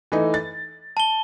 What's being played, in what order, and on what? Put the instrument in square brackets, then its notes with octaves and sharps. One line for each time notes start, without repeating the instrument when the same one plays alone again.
[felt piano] E3 A3 D#4
A6
[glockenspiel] A5 G7